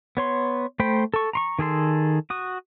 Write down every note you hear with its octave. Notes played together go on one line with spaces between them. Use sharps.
B3 C#5 C6
A3 C5 G5 B5
A4 C#6
A#5 C6 C#6
D#3 G#4 A4 C6
F#4 D#6